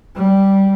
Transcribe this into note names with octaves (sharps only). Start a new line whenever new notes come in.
G3